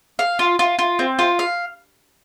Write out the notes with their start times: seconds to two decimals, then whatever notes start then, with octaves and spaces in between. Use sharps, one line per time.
0.19 F5
0.39 F4
0.59 F4
0.79 F4
0.99 C4
1.19 F4
1.39 F5